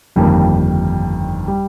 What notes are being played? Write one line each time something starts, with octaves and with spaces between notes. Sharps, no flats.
G1 F2 D#3 G3 A#3
G3